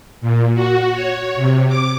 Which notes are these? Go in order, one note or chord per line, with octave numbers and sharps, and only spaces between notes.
A#2
F#4
C#5
C3
D6